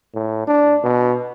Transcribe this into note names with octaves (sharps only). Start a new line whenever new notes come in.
A2
D4
B2